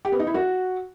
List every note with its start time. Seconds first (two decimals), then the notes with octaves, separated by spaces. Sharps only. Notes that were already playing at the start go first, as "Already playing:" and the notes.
0.05 G4
0.12 B3
0.19 D#4
0.27 E4
0.34 F#4